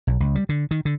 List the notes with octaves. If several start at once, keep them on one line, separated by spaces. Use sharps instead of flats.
B1
C#2
G3
D3
D#3
D3